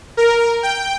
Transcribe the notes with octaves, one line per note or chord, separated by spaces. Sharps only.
A#4
G5